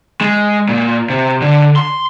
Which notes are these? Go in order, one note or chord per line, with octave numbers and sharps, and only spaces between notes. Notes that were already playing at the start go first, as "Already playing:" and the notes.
G#3
A#2
C3
D3
C6